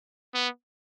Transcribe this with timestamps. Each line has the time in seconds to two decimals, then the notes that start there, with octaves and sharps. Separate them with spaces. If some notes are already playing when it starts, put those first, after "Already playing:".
0.34 B3